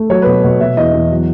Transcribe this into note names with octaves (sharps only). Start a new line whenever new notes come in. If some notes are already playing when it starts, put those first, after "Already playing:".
Already playing: A3
F#3 C#5
B4
B2
B2
B2 E5
E2 D#5
E2
F#3